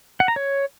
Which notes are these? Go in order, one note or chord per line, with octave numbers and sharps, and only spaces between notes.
F#5
A#5
C#5